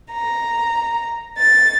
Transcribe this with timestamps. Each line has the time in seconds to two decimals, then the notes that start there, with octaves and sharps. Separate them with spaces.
0.14 A#5
1.38 A6